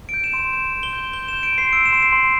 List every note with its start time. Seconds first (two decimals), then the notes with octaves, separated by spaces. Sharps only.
0.09 G6 D7
0.24 E7
0.33 C6
0.39 E7
0.53 G6 E7
0.73 C6
0.83 G7
0.93 G6
1.13 G6 G7
1.28 G6 E7
1.43 D7
1.53 C6
1.58 C7
1.73 E6 D7
1.86 E7
1.93 C6 D7
2.03 C7
2.13 C6